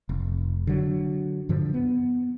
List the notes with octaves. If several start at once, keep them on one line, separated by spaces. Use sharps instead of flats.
F1
D3 F#3
G2 D3 F3
B3